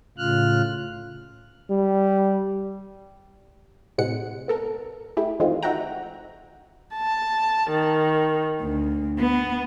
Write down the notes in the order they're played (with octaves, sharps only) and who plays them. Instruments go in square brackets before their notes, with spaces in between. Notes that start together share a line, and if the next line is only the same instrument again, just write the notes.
[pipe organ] A2 C#3 F4 F6 F#6
[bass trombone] G3
[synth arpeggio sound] A2 C3 G#3 F#5 C#7
B3 A4 A#4
A3 E4 G4 G#4
D#3 E3 G#3 A3 C4 F4
D#4 F#4 E5 F#5 G5 A#5
[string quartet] A5
D#3
D2
B3